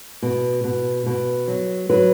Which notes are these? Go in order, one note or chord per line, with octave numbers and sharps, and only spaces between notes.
B2
B2
B2
F#3
F#3 B4